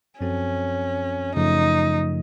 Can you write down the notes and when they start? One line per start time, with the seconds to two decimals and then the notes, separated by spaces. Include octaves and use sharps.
0.20 F#2 F3 C4 C#4 F#4 A4
1.35 F#2 C#3 F3 A3 D#4